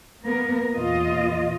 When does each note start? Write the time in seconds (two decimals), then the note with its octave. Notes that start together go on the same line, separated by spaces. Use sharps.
0.24 A#3 B3 A#4
0.74 E2 A#2 F4 D#5